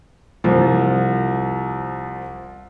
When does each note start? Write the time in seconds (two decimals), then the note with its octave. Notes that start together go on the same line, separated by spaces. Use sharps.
0.44 C2 F3